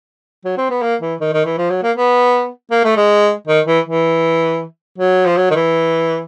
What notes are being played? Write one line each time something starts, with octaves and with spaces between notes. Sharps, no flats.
F#3
C4
B3
A#3
E3
D#3
D#3
E3
F3
F#3
A#3
B3
A#3
A3
G#3
D#3
E3
E3
F#3
F3
F#3
D#3
E3